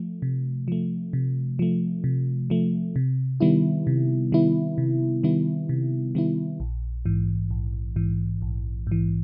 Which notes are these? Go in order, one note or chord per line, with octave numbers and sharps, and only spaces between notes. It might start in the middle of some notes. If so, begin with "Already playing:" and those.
Already playing: F3 A3
C3
F3 A3
C3
F3 A3
C3
F3 A3
C3
D#3 G3 B3 E4
C3
D#3 G3 B3 E4
C3
D#3 G3 B3 E4
C3
D#3 G3 B3 E4
A#1
G#2 E3
A#1
G#2 E3
A#1
G#2 E3